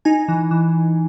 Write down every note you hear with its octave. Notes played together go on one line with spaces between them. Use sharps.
D#4 G#5
E3
E3